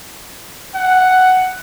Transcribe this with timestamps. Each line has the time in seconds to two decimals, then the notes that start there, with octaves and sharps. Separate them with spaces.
0.75 F#5